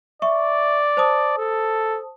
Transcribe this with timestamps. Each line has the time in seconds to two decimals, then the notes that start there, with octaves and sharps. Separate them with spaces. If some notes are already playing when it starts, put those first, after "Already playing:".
0.22 D5 E5 C#6
0.97 C5 A5 D#6
1.38 A4